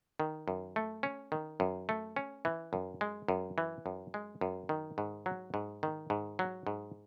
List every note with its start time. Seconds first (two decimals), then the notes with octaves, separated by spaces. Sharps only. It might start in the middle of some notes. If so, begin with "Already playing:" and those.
0.20 D#3
0.48 F#2
0.76 A3
1.03 C#4
1.32 D#3
1.60 F#2
1.89 A3
2.16 C#4
2.45 E3
2.73 F#2
3.01 G#3
3.28 F#2
3.58 E3
3.86 F#2
4.14 G#3
4.41 F#2
4.69 D#3
4.98 G#2
5.26 F#3
5.54 G#2
5.83 D#3
6.10 G#2
6.39 F#3
6.67 G#2